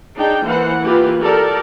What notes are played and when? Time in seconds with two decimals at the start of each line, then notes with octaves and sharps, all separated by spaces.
0.16 D4 D#4 G#4 G5
0.45 E3 A#3 C5 F#5
0.83 E3 A#3 F4 G4 B4
1.20 G4 A4 A#4 D5